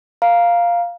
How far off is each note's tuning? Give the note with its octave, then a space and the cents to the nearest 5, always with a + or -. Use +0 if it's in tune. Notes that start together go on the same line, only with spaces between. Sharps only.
F5 +0 A#5 +10